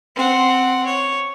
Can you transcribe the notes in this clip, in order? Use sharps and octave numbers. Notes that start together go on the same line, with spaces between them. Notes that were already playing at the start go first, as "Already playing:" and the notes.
C4 F#5
C#5